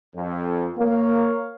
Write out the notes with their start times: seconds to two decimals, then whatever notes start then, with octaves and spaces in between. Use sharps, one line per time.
0.16 F2
0.78 A#3 A#4 C#5 F5